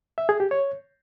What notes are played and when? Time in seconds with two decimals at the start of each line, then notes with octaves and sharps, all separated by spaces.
0.18 E5
0.29 G#4
0.40 G4
0.51 C#5